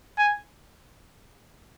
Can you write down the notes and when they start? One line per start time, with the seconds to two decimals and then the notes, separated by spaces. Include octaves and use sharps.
0.18 G#5